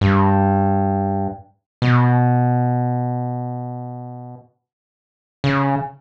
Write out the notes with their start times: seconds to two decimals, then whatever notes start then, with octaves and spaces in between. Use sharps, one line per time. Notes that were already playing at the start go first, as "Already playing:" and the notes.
0.01 G2
1.82 B2
5.44 C#3